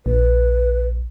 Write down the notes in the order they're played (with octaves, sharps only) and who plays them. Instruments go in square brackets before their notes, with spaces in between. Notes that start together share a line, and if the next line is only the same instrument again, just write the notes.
[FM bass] A#1 [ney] B4